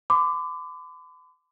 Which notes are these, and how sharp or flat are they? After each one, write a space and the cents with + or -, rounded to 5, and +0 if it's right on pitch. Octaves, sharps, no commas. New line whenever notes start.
B5 +45 D6 +0